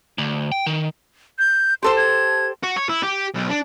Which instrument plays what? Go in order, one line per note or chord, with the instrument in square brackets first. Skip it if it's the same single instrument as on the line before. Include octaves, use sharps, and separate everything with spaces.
[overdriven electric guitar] D2
G5
D#3
[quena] G6
[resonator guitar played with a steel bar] G4 A4 C5 [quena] C6
[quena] G#6
[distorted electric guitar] F#4
C#5
E4
G4
B1
D4